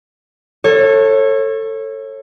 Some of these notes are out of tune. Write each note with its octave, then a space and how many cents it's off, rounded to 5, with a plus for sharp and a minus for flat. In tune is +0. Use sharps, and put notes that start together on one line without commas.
A4 +20 C#5 -25